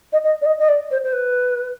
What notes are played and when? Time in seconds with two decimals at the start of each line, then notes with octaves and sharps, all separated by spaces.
0.13 D#5
0.24 D#5
0.41 D5
0.46 D#5
0.59 D#5
0.69 D5
0.91 C5
1.04 C5
1.13 B4